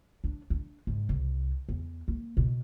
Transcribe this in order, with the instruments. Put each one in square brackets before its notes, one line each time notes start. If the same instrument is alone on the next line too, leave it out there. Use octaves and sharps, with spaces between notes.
[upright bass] D4
D4
G#2
C2
E2
A#3
B2